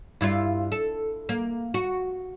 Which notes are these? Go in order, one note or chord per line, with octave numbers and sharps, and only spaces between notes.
G2 E4 F4
A4
A#3
F#4